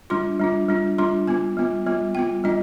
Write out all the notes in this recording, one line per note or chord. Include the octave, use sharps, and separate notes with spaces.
G3 D4 F4 C6
G3 D4 F4
G3 D4 F4
G3 D4 F4 C6
G3 B3 F4 G#5
G3 B3 F4
G3 B3 F4
G3 B3 F4 G5
G3 D4 F4 D#5